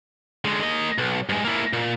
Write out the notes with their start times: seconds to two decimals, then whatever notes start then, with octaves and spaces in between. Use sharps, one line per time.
0.45 D3 G#3
0.63 A#3 D#5
0.98 B1
1.29 G2 G#3
1.44 A#3 E4
1.73 A#2